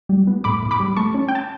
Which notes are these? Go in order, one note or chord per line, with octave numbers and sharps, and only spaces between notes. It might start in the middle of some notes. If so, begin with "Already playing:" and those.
G3
B3
A2 B5 D6
A2
B5 D6
G3
A3 A5 C#6
C#4
G5
A5